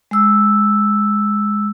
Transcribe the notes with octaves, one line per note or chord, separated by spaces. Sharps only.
G#3 E6